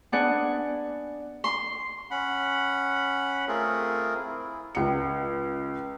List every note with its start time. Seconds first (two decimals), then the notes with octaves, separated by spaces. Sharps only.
0.12 B3 D4 G#4 D5 F#5 G#5
1.44 C6
2.11 C#4 F#5 B5
3.48 A3 C4 F4 G#4 A#4
4.17 E4
4.75 C#2 C#7